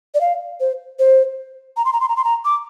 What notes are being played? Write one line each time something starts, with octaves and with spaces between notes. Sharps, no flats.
D5
F5
C5
C5
A#5
C6
A#5
C6
A#5
C6
A#5
D6